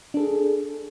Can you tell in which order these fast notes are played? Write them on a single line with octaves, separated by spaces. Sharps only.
D4 A4 G#4